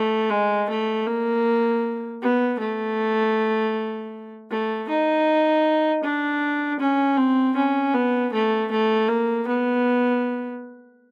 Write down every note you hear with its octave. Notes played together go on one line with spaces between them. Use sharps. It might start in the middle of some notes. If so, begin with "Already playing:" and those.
Already playing: A3
G#3
A3
A#3
B3
A3
A3
D#4
D4
C#4
C4
C#4
B3
A3
A3
A#3
B3